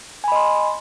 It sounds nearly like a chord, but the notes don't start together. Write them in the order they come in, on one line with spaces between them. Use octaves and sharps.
G#5 B5 D#5 C6